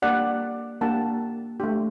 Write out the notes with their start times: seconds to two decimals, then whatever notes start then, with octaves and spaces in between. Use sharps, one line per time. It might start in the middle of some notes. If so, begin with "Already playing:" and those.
0.02 A#3 D4 G4 D5 F#5
0.81 A#3 D4 G4 F#5 A5
1.60 A3 D4 G4